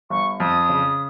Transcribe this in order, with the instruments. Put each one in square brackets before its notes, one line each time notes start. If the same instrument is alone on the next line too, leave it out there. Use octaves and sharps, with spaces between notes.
[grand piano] G1 [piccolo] C#6
[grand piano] F2 [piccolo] D#6
[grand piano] C#3